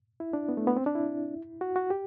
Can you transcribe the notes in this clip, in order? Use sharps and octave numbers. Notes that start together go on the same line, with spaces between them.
E4
D4
B3
A3
B3
C4
D4
E4
F#4
F#4
G4